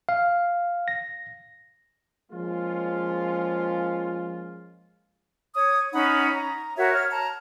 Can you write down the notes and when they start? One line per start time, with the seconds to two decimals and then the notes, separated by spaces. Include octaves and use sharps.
0.09 F5
0.88 A#6
2.32 F3 G#3 A#3 C#4 F4
5.55 C#5 D#6
5.93 C#4 D#4 F#5 B5
6.34 A#5
6.76 F#4 A#4 C#5 E5
6.94 C#5 F6
7.11 A5 A#5